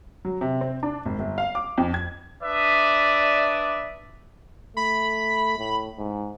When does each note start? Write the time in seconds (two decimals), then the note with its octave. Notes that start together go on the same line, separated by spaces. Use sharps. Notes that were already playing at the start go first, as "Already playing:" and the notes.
0.25 F#3
0.41 C3
0.61 C4
0.83 D4
1.05 G#1
1.19 G1
1.38 F5
1.55 D6
1.78 F2
1.94 G#6
2.43 D4 B4 D5 E5 D#6
4.77 A3 B5
5.59 A2
5.98 G#2